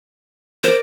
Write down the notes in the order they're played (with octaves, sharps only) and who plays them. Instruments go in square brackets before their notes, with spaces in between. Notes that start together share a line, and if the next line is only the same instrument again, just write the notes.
[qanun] A#4 D5 [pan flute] C5